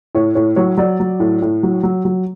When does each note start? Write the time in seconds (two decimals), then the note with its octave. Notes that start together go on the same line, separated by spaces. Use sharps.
0.15 A2 C#5
0.35 A2 C#5
0.56 F#3 C#5
0.78 F#3 D5
1.00 F#3
1.20 A2
1.42 A2
1.63 F#3
1.83 F#3
2.05 F#3